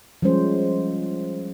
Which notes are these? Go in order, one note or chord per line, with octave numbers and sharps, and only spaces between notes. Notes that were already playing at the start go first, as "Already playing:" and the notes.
F3 G3 G#3 C#4 C5